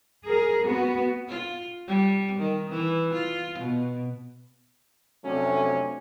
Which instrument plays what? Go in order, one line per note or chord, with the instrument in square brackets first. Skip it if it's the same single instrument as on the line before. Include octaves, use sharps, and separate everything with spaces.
[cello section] G#4 A#4
B3 F#4
[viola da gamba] F4
G3
D#3
E3
F4
B2
[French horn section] F2 C3 F#3 A3 C#4 D4